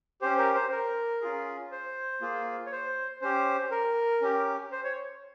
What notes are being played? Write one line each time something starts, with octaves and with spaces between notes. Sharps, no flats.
C#4 G4 C5
A#4
C5
A#4
C#4 F4 G#4
C5
A#3 F4 G#4
C#5
C5
C#4 G4 C5
A#4
C#4 G4
C5
C#5